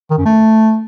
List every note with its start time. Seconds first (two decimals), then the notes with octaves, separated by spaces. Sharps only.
0.11 D#3
0.18 F#2
0.25 A3